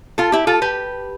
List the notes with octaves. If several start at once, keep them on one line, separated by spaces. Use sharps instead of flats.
F4 A4
E4 G4
F4 A4
G4 B4